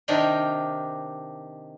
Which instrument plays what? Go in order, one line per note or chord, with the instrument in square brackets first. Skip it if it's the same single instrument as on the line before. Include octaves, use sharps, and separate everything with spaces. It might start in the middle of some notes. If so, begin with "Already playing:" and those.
[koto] C3 D#3 D4 A#4 D#5 G5